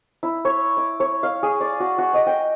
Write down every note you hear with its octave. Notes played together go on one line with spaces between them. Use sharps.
E4
C#5
D6
C#5
F5
G#4
D5
F#4
F#4
D#5
G5